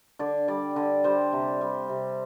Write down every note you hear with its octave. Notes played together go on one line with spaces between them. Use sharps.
D3 D5
G3 D5
D3
G3 C5
C3
G3
C3